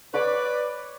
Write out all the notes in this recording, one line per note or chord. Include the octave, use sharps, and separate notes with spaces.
B4 C#5 D5 B5 D6